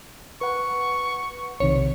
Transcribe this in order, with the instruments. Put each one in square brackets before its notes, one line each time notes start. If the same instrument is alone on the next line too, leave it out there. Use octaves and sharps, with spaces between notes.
[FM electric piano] B4 F#5 [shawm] C#6
[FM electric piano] B1 C3 D#3 [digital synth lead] C#5